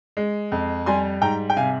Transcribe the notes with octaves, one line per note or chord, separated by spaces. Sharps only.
G#3
F2
G3 G#5 C6
G#2 G5 A#5
G5
C3 F5 G#5